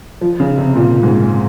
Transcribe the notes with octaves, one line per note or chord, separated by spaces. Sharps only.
F3
C#3
C3
A#2
G#2